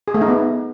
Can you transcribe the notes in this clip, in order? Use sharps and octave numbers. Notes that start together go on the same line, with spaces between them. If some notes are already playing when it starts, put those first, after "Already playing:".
G#4
A3
D#4
B3